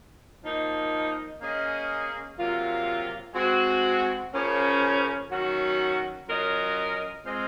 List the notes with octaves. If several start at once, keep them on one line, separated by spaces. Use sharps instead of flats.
F3 A#3 D#4
A#3 C#4 G#4 D#5
C3 F#3 A#3 F4
G#3 C4 F#4
C#3 F3 A#3 C#4
D#3 F#3 C#4 F#4
F#3 C#4 F4 A#4 D#5
G#3 C4 F4 C5 D#5